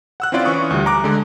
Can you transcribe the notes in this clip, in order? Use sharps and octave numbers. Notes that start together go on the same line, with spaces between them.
F#5 E6 F#6
C4 C#4 E4 F4 D5
E3 C#4 C#6 D#6
D2 G3
A#5 D6 F#6
D3 G#3